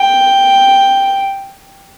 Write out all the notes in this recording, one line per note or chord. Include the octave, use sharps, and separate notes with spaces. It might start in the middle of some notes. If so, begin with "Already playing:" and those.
Already playing: G5